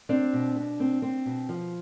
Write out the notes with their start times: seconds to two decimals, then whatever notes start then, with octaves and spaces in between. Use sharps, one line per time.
0.09 C4 D4
0.33 B2
0.56 B2
0.80 C4
1.02 C4
1.26 B2
1.49 F3